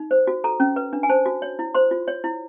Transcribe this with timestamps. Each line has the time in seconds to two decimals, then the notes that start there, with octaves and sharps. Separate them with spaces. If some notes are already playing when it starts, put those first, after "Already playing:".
Already playing: D#4
0.11 C5
0.27 F#4
0.44 A4 A#5
0.60 C#4
0.76 B4
0.93 D4
1.03 G#5
1.09 C5 A5
1.26 F#4
1.42 C#5
1.59 E4
1.74 C5 C6
1.91 F4
2.08 C#5
2.24 E4